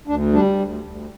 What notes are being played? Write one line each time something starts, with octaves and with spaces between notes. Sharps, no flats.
D2 D4
G3 D4
D2
D2